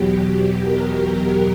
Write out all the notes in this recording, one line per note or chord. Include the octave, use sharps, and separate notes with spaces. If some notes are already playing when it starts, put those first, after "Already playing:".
Already playing: E2 B2 F#3 G4
A#4